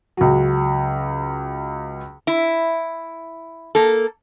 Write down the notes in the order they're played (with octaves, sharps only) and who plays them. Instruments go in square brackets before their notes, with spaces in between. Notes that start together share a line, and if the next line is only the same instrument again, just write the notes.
[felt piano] C#2 F#3
[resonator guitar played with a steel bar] E4
A#3 A4